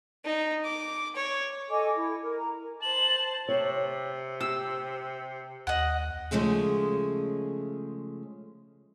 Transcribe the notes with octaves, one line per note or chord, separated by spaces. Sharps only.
D#4
D6
C#5
A4 D#5 G#5 D6
E4
A#4
A#5
C5 A5 F#7
C3 C#5
G4 E6
D#2 D#5 F#5
C#3 F3 G#3 A3 G#4